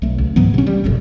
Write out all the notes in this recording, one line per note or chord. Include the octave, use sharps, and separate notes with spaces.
B1 A3
C#2
G#2 E3 F#3 B3
C3 C#4
G3
F1 B1 F#2 A2